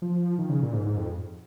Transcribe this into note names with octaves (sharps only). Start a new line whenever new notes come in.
F3
D#3
C#3
A#2
G#2
G#2
F2